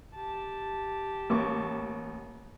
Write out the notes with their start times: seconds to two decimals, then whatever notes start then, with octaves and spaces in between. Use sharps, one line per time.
0.15 G4 A5
1.30 A1 A#3 C#6 D6